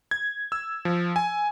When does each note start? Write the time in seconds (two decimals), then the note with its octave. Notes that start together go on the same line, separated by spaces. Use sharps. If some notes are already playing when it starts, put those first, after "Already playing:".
0.11 G#6
0.52 E6
0.85 F3
1.16 G#5